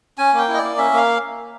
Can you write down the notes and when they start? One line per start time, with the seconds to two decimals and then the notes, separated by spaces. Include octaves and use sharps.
0.18 C#4 G#5
0.33 A#3 G5
0.48 E4
0.54 D#5
0.58 A#3 D5
0.78 C#4 E5
0.93 A#3 F5